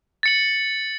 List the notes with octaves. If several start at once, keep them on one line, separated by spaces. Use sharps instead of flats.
A6 C#7 F#7